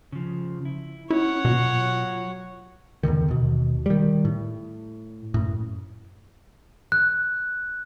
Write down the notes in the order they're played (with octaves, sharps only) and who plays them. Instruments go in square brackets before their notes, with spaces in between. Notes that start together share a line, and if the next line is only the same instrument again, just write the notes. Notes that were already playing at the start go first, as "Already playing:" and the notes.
[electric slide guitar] C#3 F3
E4
[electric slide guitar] C#4 [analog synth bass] E4 [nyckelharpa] C#5 F#5
[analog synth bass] B2 [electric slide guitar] F#3 F4
[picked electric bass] E2 B2 D3 D#3
D#2 B2
D#3 G3
A2
F#2 A2
[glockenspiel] F#6